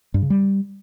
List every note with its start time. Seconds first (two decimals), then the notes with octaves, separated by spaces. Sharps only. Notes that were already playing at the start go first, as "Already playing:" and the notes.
0.14 G2
0.22 C#3
0.30 G3